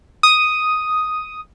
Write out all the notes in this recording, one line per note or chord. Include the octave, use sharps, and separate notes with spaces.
D#6